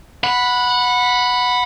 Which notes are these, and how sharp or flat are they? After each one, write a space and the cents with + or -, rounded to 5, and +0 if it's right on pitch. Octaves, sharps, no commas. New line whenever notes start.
F#5 -15 B5 +0